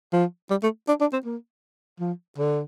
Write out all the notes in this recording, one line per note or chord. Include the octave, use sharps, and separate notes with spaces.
F3
G3
A3
D4
D4
C4
A#3
F3
D3